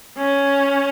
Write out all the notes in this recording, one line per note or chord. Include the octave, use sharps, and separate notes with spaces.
C#4